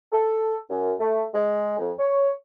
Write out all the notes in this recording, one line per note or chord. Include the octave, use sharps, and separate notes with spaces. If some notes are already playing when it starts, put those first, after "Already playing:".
A4
F#2
A3
G#3
F2
C#5